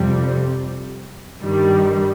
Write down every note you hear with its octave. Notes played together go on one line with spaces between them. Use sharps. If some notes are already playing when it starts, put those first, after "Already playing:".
Already playing: F2 C3 G3
G2 D#3 G3